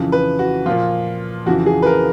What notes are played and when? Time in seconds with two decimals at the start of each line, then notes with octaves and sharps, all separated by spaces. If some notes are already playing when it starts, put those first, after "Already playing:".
Already playing: F2 C#3 E3
0.12 B4
0.39 F#4
0.66 A#2 F3 F4
1.46 F2 C#3 E3 F#4
1.66 G#4
1.82 B4
1.86 A#4